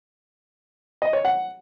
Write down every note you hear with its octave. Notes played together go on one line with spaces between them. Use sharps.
D#5
C#5
F#5